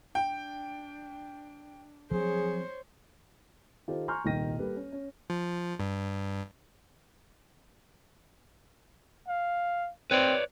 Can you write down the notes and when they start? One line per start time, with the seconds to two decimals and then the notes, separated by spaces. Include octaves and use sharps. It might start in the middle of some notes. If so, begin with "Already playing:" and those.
0.15 D4 G5
2.11 F3 F#3 C4 G#4 C5 C#5
3.88 D#3 F4 G4 A4 C5
4.08 G#5 A#5 C6 C#6 F6 G6
4.25 D#1 C2 D#3 G5 A#6 D#7
4.59 G3 A#3 G4 A4 B4
4.76 C#4
4.92 C#4
5.30 F3
5.80 G2
9.28 F5
10.11 C4 B4 C#5 D5